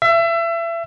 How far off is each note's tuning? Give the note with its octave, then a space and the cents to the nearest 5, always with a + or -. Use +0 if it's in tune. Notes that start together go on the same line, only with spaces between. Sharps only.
E5 +30